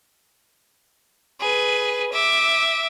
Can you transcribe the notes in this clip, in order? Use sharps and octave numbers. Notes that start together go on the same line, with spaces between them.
G#4 B4
E5 D6